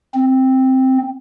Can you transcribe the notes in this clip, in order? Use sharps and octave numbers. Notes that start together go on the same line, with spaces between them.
C4